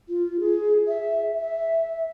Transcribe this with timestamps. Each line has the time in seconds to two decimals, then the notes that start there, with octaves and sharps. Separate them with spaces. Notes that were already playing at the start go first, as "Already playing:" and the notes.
0.09 F4
0.40 G#4
0.88 E5
1.38 E5